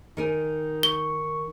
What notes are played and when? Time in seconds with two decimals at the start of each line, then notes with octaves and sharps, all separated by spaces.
0.17 D#3 D#4 A#4 G#5
0.83 C#6 G7